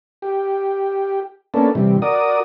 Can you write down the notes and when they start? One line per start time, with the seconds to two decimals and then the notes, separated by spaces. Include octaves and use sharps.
0.22 G4
1.54 A#3 B3 C#4 D4 A4
1.75 C3 E3 G3
2.02 F#4 A#4 D5 D#6